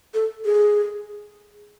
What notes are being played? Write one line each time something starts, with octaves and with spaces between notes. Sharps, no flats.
A4
G#4